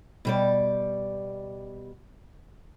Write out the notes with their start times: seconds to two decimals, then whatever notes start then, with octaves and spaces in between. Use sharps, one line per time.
0.25 B2 G3 D5